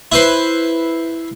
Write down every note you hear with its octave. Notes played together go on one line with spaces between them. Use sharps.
E4 B4 C5